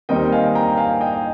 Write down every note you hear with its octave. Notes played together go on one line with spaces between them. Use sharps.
D#2 D#3 G3 C4 D#4 D#5 G5
F5 G#5
G5 A#5
F5 G#5
D#5 G5